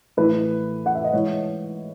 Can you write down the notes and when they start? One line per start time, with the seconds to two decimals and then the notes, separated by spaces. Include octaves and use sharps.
0.17 A2 E3 B4
0.86 F#5
0.95 E5
1.04 D#5
1.13 G#2 E3 C#5